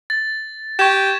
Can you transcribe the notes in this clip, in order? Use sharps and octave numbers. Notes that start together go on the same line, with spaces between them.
A6
G4 C#6 G#6 E7